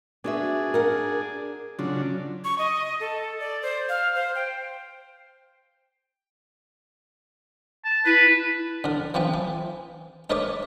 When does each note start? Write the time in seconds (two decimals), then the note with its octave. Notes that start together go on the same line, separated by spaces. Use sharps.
0.24 B3 D4 F#4 G#4 E5
0.74 A#4 F#5
1.79 C#3 F#3 D4 F4
2.44 C#6
2.58 D#5
3.00 A4
3.40 D5
3.63 C5
3.89 F5
4.15 C5
4.35 G5
7.85 A5
8.06 E4 B4
8.84 D3 A#4
9.14 E3 F3 C4 B4
9.34 E3
10.30 D#4 A#4 B4 C#5 E5 D6